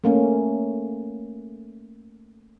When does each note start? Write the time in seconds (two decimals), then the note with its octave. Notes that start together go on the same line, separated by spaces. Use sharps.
0.04 A3 A#3 C#4